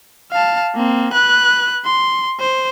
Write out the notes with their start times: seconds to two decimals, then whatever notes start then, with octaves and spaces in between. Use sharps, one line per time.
0.32 F5 A5
0.75 A#3 C4
1.13 B4 F#6
1.85 C6
2.40 C5